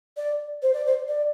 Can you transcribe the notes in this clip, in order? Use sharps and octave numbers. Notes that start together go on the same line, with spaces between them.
D5
C5
D5
C5
D5